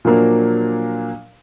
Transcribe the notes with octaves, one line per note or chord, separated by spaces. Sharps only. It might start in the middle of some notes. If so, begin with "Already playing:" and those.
A#2 F3 F#3 A#3 D4 A#4